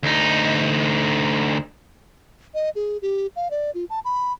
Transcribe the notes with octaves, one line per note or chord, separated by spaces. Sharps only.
D2 D#4
D#5
G#4
G4
F5
D5
F4
A5
B5